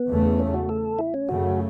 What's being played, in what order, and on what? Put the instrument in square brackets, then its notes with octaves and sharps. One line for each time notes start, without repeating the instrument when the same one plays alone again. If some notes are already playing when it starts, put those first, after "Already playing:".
Already playing: [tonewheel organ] B3
[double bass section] E2 C#3 A3
[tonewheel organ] C#4
F#4
A4
E4
C#4
[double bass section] F#2 C#3 A3 [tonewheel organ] F#4